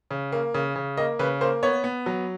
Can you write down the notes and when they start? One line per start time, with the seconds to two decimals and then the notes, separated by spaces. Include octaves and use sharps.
0.11 C#3
0.32 A#3
0.54 C#3
0.76 C#3
0.97 A#3 D#5
1.19 C#3 B4
1.41 A#3 C5
1.63 B3 C#5
1.84 B3
2.06 F#3